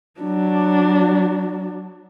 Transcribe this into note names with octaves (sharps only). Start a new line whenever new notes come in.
F#3 D4